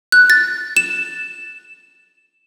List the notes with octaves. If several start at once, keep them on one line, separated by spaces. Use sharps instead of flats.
F#6
A6
E7